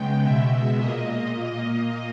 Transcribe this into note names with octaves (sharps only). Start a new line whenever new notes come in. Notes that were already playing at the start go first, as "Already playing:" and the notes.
Already playing: C#3 G#3 B3 G5
B2 G#3 B3 E5
A#2 A#3 D#5